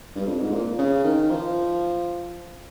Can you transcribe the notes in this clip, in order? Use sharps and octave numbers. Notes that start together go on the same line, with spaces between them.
G2
F2
G#2
A#2
C#3
D#3
F3